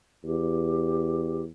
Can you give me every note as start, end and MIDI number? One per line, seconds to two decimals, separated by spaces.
0.24 1.48 40
0.24 1.43 67